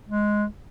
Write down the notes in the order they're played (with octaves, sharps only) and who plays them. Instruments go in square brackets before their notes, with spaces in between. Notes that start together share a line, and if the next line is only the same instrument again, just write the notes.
[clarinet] G#3